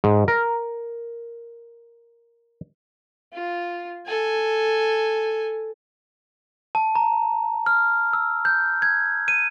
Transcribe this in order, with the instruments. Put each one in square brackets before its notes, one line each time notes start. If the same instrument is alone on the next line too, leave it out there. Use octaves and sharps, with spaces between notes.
[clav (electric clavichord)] G#2
A#4
[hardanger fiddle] F4
A4 G#5
[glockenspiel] A5
A#5
F6
E6
G6
G#6
D#7